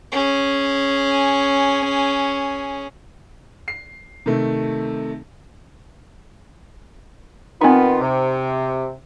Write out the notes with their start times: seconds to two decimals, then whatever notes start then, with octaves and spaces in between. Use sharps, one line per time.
0.12 C#4 G#4
3.68 C7
4.26 C3 D#3 A3
7.61 D#3 B3 C4 D#4 F4
8.01 C3